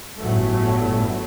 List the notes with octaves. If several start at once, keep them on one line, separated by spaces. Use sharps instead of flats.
G1 A2 F#3 A3